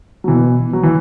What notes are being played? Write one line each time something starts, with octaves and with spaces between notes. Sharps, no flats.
F#3
B2 E3
F#3
E3